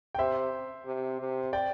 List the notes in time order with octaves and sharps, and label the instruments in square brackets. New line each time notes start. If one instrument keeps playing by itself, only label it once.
[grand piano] G5
[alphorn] C3 [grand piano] C5 E5
[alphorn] C3
C3
[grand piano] D5 G5